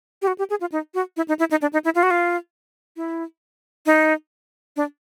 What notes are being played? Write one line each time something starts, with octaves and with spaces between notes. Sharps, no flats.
G4
F#4
G4
G#4
F4
D#4
F#4
E4
D#4
E4
D#4
D4
D#4
E4
F4
F#4
F4
E4
D#4
D4